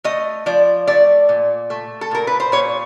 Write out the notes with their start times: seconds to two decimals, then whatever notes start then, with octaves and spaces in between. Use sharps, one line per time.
0.04 A3 D#5
0.46 F3 D5
0.87 A3 D5
1.29 A#2
1.70 A3
2.01 A4
2.11 A#2 A#4
2.27 B4
2.40 C5
2.52 A#2 C#5